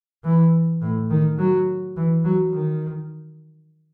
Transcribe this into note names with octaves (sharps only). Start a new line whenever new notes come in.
E3
A2
D#3
F#3
E3
F#3
D#3